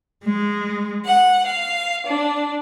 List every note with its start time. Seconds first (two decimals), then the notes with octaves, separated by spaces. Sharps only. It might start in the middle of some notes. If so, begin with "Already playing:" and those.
0.24 G#3
1.06 F#5
1.46 F5
2.07 D4